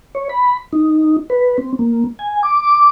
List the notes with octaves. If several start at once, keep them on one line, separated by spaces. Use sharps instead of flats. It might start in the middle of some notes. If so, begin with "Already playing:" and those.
C#5
B5
D#4
B4
C4
A#3
G#5
D6